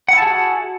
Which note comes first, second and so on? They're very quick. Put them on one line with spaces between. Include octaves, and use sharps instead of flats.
F#5 E4 A5 G#4 F#4